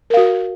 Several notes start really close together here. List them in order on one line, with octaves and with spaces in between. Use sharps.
A#4 F5 F#4